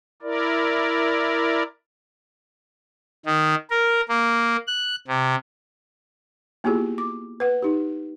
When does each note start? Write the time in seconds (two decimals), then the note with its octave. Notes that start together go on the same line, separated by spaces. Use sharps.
0.22 E4 A#4 D5
3.26 D#3
3.70 A#4
4.09 A#3
4.67 F#6
5.07 C3
6.64 A#3 B3 E4 F4 G4 G#4
6.98 D6
7.40 B4 F#5
7.62 D#4 G4